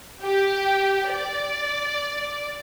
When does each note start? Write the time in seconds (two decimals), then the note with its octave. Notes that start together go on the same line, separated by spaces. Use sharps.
0.21 G4
1.11 D5